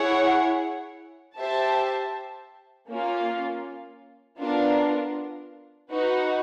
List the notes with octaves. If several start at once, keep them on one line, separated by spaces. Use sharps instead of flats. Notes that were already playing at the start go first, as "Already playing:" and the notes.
Already playing: E4 G#4 C#5 F#5
G4 C5 E5 A5
A#3 C#4 F4
B3 D4 F4 A#4
D#4 F#4 B4